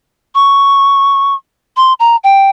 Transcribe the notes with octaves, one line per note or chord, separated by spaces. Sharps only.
C#6
C6
A#5
G5